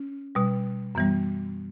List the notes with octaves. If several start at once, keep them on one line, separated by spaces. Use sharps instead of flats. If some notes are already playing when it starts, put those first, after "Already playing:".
Already playing: C#4
B2 G3
F#2 E3 G3 B3